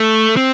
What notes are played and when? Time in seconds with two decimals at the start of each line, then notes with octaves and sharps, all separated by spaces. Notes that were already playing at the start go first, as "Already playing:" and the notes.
Already playing: A3
0.37 C4